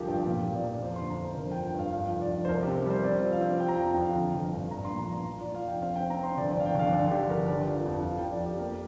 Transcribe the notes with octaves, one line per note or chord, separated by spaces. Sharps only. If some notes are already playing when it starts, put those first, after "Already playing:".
Already playing: G1 C2 F3 G4 A#4
G2 G5
A#2
A#2
D5
A#3
F2 C5
D3 C6
A#5
F2 C5
C5
G1 A#4
G5
F3
G5
G2 F5
F3 F5
F1
D5
F1
C5
C2 A#4
C3 G4
A#4
G3 C5
C4 D5
F3
F5
C4
F3 G5
A#5
F2 G5
G5
F2 F5
D3
G1
G2
A#1 A#5
C6
A#2
A#5
A#2
C6
F3 A#5
F3 D5
F5
F1 G5
C4 F5
C4 G5
A#5
C4 C6
G1 D5
D5
G1 F5
G5
G1 F5
D3 D5
D3 G4
G1 A#4
D3 D5
F3
F2
F2 F5
F2 G5
D5
F2 G4
A#3 A#4